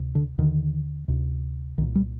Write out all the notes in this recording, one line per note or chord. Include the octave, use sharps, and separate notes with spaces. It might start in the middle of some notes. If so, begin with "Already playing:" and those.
Already playing: D2 C3
D3
D#2 D3 D#3
D2 C3
C2 A#2 D#3
G3